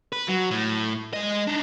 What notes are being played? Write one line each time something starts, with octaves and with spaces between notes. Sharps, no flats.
B4
F#3
A2
G#3 D#5
D4 D#4